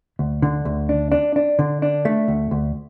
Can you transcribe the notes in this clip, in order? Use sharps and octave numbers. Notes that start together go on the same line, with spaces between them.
D2
D3
D2
D4
D4
D4
D3
D4
A3
D2
D2